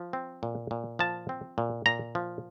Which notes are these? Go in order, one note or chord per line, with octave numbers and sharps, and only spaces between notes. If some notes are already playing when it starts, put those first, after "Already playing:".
Already playing: F3
C4
A#2
A#2
F3 A5
C4
A#2
A#2 A#5
F3